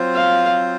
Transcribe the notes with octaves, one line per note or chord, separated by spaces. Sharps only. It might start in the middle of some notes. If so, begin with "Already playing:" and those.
Already playing: F#3 C4 F4 C5
F5